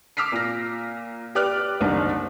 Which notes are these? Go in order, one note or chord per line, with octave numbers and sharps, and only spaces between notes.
D6 E6 F6 B6 C7
A#2 A#6
G4 B4 D5 D6 F6 F#6
F#1 C2 D#3 A#3 D4